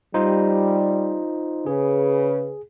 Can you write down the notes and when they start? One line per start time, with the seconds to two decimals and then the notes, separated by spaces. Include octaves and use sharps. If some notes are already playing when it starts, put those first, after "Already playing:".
0.14 G3 D#4 F4 C5
1.66 C#3 G#4 B4